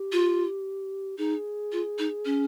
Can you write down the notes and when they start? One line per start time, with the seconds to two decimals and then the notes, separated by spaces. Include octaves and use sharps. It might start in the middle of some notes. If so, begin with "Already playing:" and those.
Already playing: G4
0.12 F4
1.18 D#4 G#4
1.72 F4
1.99 D#4
2.25 C#4